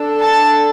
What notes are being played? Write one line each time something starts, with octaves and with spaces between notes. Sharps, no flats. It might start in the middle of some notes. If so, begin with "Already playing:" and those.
Already playing: D4 A4
A5